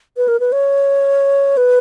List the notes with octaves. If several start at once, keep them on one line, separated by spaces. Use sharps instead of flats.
B4
A#4
B4
C#5
B4